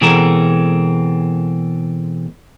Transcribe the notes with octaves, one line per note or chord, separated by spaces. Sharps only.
B2 E3 G#3 C4 A4 A#4